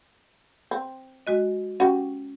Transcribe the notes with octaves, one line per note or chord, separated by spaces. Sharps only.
C4
G#3 F#4 D#5
C#4 F#4 G4